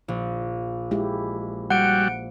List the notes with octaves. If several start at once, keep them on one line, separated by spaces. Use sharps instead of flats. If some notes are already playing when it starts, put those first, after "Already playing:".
A#1
G#3 E4 G4
G3 F#4 F#5 D7